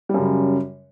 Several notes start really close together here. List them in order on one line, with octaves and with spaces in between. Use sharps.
G3 F#2 C#3